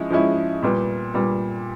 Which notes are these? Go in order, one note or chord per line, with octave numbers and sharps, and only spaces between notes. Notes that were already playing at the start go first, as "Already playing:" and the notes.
Already playing: F3 G#3 C#4 E4
F3 G#3 C#4 E4
A#2 G3 B3
A#2 G3 B3